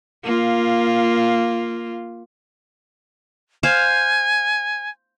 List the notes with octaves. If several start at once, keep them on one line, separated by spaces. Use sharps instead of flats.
A#3 F4
C5 F5 G#5